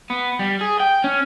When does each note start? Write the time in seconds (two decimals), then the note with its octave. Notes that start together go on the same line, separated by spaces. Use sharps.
0.10 B3
0.39 G3
0.61 G#4
0.80 G5
1.04 C#4